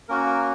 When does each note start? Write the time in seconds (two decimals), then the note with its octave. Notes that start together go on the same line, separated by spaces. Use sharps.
0.09 A#3 C#4 F#4 A#4
0.26 A#4